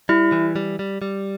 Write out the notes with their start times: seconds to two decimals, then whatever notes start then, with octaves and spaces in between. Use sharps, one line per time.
0.09 G3 E4
0.32 E3
0.56 G3
0.79 G3
1.02 G3